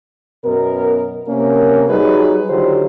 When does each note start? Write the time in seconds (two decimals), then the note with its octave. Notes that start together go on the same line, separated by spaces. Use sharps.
0.45 F#2 B2 B3 A#4
1.28 C3 A#3 C#4 A#4
1.89 F#3 G3 D#4 F#4 G#4 B4
2.50 D3 D#3 F#3 F4 G4 C5